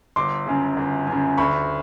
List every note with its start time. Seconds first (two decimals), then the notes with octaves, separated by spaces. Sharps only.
0.16 G1 C6 D6
0.47 F#2 C#3
0.77 G1
1.07 F#2
1.12 C#3
1.37 D2 B5 C#6